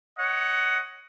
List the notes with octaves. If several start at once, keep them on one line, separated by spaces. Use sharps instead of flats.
C#5 D#5 F#5